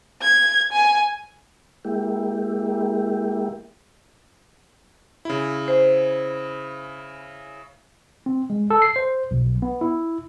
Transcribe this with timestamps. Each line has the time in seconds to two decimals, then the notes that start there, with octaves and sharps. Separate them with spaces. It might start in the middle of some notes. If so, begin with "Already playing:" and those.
0.22 G#6
0.72 G#5
1.85 G#3 A#3 E4 G4
5.25 C#3 E4
5.68 C5
8.26 C4
8.50 G#3
8.70 A4
8.82 C7
8.96 C5
9.31 B1
9.62 B3
9.81 E4